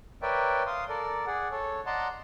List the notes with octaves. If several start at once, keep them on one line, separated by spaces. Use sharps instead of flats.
A#4 B4 C#5 D5 E5 G5
F5 C6 D#6
A4 A#4 D5
G#4 D5 F#5
A4 C#5
D5 D#5 F#5 A5 A#5 C6